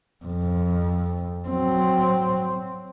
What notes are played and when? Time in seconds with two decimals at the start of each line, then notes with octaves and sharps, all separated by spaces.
0.26 F2
1.49 F#3 C4